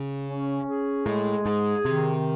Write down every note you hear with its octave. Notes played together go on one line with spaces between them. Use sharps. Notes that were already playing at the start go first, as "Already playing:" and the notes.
Already playing: C#3
C#4
G#4
A2 G#3
G#2 G#4
C3 D#3